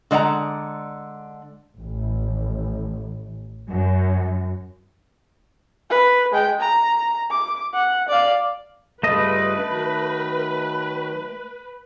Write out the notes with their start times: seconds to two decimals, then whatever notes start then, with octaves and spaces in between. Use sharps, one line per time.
0.11 D3 G#3 D5 F#5 A#5
1.81 A1
3.68 F#2
5.90 B4
6.32 G#3 G5
6.61 A#5
7.31 D6
7.74 F#5
8.08 D5 F5
9.03 G2 C#3 A3 F4 B4 D#5
9.68 D#3 F#3